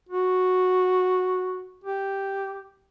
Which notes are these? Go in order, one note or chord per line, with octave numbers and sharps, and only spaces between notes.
F#4
G4